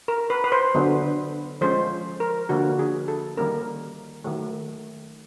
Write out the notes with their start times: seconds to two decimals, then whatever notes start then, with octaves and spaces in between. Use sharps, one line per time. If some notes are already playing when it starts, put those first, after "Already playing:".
0.08 A#4
0.30 B4
0.44 B4
0.52 C5
0.75 D3 F#3 B3
1.61 F3 G#3 C#4 C5
2.20 A#4
2.49 D3 F3 A#3 F#4
2.79 G#4
3.08 A4
3.37 D#3 G3 A#3 C#4 A#4
4.24 D#3 F#3 A3